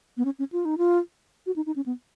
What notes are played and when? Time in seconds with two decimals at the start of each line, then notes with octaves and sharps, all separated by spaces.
0.17 B3
0.25 C#4
0.39 C#4
0.52 F4
0.65 D#4
0.78 F4
1.46 F#4
1.56 D#4
1.66 D#4
1.76 C#4
1.86 B3